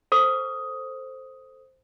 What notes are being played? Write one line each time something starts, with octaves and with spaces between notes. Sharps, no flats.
A4 C5 D#6